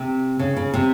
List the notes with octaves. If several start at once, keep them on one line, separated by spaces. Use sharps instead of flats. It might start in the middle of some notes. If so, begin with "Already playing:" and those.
Already playing: C3
C#3
C#3
C3